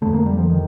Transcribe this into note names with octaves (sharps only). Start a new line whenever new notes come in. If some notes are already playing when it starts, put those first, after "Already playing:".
F2 D3 A3
A#3
G3
F3
D#3